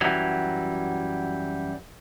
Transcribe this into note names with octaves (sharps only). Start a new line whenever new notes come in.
F#2 E3 F#3 G3